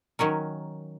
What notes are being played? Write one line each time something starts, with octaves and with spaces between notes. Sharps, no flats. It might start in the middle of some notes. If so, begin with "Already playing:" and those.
D#3 F#3 C#4 A#4